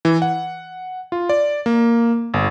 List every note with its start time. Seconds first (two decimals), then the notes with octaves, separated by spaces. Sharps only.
0.05 E3
0.22 F#5
1.12 F4
1.29 D5
1.66 A#3
2.34 G1